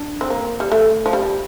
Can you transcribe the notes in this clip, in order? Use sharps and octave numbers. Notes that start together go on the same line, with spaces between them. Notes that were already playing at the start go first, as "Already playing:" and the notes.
Already playing: D4
C4
A#3
G3
A3
F3
G3